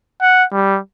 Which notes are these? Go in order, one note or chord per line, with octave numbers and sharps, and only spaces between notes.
F#5
G3